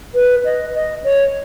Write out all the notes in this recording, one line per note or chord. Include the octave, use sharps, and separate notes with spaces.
B4
D#5
D#5
C#5